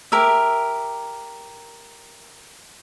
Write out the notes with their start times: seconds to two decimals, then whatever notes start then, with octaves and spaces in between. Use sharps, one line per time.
0.12 G4 A#4 E5